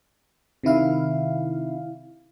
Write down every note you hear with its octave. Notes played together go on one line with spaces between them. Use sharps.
C3 D#3 E4 F5